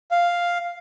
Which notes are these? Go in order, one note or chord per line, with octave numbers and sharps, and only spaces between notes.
F5